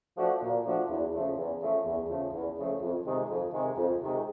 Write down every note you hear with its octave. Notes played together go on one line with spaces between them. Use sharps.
F3 A3 D4 F#4
A#2
F3 A3 D4 F#4
E2
C#3 F3 A3
E2
C#3 F3 A3
E2
C#3 F3 A3
E2
C#3 F3 A3
F2
C3 D#3 G#3
F2
C3 D#3 G#3
F2
C3 D#3 G#3